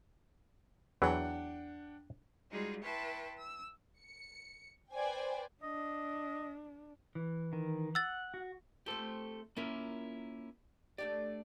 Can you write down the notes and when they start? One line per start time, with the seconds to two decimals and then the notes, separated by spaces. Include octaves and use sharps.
1.02 E2 E3 F#3 D4 F#5 G5
2.51 G3 G#3 D#4 F4 F#4 G#4
2.83 E4 B4 G5 A5 C6 C#6
3.38 E6
3.99 C#7
4.93 B4 C5 D5 G5 G#5
5.63 D4 D#5
7.15 E3
7.53 D#3
7.95 F#5 E6 A6
8.34 F#4
8.86 A3 C4 F4 G4 A4
9.57 A#3 C#4 E4 F4 A#4
10.98 A3 D4 G4 D5